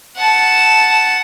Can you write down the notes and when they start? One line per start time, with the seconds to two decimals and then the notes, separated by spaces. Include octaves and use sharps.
0.16 F#5 A5